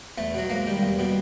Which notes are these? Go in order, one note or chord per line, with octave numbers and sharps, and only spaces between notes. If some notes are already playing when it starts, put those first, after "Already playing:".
E2 A3
B2 F#3
G#2 A#3
D#3 G3
E2
B2 G3